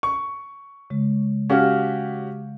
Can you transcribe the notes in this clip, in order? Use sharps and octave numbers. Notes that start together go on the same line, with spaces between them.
C#6
C#3 G#3
C#4 F#4 G4 F5 F6